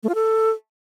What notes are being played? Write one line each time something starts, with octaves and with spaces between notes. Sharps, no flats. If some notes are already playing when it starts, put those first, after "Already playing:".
A3
F4
A4